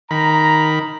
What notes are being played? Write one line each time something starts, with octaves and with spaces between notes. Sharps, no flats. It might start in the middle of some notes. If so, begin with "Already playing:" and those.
D#3 A#5 B5